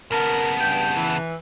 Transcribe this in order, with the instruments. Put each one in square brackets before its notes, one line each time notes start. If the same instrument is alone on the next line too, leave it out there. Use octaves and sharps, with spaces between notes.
[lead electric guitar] C#3 B3 [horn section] A#4 [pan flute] A5
[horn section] G2 G5
E3